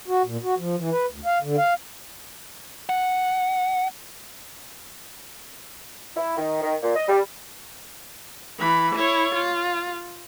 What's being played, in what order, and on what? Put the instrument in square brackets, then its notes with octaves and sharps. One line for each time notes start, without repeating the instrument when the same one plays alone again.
[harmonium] F#4
A#2
F#4
F3
E3
B4
D2
F5
D3
F5
[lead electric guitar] F#5
[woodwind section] E4
D#3
D#3
A#2
D#5
G3
[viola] E3 B5
E4 C#5
F4